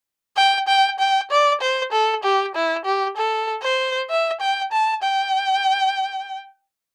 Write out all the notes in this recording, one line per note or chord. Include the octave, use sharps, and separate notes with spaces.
G5
G5
G5
D5
C5
A4
G4
E4
G4
A4
C5
E5
G5
A5
G5